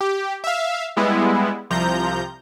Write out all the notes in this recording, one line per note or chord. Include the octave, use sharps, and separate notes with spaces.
G4
E5 F5
G3 G#3 B3 E4
C2 C3 F3 A#5 G6